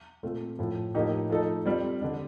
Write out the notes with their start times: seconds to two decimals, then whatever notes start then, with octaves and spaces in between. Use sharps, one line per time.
0.23 A#2 A3 C4 F4
0.58 A2 F3 A3
0.95 A2 F3 A#3 D#4 G4
1.30 F3 A3 D#4 A4
1.66 G3 C4 F4
2.01 D3 G3 D4